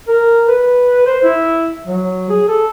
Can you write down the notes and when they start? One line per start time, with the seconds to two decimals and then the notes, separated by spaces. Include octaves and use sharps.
0.08 A#4
0.48 B4
1.07 C5
1.24 E4
1.87 F#3
2.30 G#4
2.48 A4